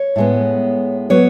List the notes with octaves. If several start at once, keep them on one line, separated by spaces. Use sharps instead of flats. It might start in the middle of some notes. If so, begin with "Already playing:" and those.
Already playing: C#5
A2 G#3 B3
F#3 B3 C#5